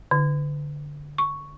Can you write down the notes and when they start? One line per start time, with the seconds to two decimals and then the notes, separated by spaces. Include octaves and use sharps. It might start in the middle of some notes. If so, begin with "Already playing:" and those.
0.11 D3
1.18 C#6